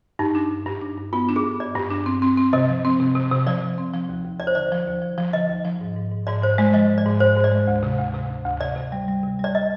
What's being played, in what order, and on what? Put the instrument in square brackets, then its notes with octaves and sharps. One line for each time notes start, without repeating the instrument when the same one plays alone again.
[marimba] G2 [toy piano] D#4
[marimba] D4
G2
G2
D4
G2
[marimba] B3 [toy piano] F4
[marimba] D4
[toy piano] G#4
[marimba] G2
[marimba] G2 [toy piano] D5
[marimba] G2
D4
C4
C4
C4
[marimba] C3 [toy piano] D#5
[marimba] F3
C4
C3
C3
C3
[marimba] F3 [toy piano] D5
[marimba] C3
C4
F3
D#2
D#2
[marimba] D#2 [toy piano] D5
[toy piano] C5
[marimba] D3 [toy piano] D5
[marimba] F3
D#2
F3
F3
[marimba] D3 [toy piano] D#5
[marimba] D#2
F3
G#2
G#2
G#2
[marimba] G#2 [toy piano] D5
[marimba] G#2 [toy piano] C5
[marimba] G#3 [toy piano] D5
[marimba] F3 [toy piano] D#5
[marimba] G#2
[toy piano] D5
[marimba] G#2
[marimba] G#2 [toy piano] C5
[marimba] G#2
[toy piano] D5
[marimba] G#3
D2
C3
D2
C3
D2
D2
[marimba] C3 [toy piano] D5
[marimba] C3
G3
G3
C3
[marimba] G3 [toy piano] D5
[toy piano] D#5